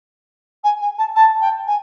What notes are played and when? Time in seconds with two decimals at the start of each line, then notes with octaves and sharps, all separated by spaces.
0.64 G#5
0.81 G#5
0.98 A5
1.15 A5
1.41 G5
1.67 G#5